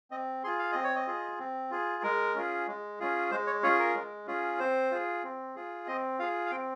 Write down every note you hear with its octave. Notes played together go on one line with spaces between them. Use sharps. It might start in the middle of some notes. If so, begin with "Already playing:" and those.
C4 D#5
F4 G#4 C6
F5
C4 D#5
C#5
D#5
F4 G#4
C4
F4 G#4
G#3 A#4
C#4 F4 G#4
G#3
C#4 F4 G#4
G#3 C5
C#5
C#4 F4 G#4 C#5
A#4
G#3
C#4 F4 G#4
C4 C5
F4 G#4
C4
F4 G#4
C4 D#5
F4 G#4 F5
F5
C4 G5